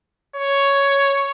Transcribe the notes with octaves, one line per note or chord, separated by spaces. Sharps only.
C#5